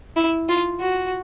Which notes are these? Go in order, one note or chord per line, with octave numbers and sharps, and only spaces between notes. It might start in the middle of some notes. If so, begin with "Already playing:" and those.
E4
F4
F#4